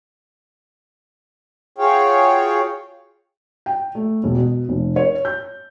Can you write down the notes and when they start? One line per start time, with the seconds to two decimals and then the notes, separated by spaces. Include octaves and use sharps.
1.78 F4 F#4 G#4 C#5 F5 G5
3.66 G5
3.95 A3
4.24 E1
4.35 B2
4.69 F1
4.96 C#5
5.25 G6